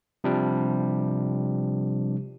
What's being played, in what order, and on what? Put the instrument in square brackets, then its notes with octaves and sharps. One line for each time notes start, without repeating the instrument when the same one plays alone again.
[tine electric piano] C3 F3 G3 D4